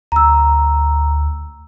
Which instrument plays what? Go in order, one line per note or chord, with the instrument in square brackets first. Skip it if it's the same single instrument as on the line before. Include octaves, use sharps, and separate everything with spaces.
[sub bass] D2 [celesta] A#5 E6